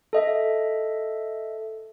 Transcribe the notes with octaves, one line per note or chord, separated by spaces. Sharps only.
A4 D#5 E5